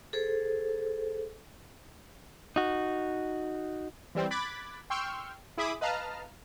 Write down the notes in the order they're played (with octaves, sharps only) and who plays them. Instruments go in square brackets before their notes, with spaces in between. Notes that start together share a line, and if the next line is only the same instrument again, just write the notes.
[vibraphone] G#4 A4 C5
[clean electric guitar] D#4 F#4
[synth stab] E3 G3 C4
B5 D6 F#6 G#6 A6 B6
G5 C6 C#6 E6 F6 G6
E4 G#4 E5 B5 D6 D#6
B4 D#5 F5 A5 A#5 F6